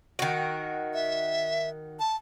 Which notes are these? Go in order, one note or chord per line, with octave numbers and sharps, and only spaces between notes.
D#3 F#4
E5
A5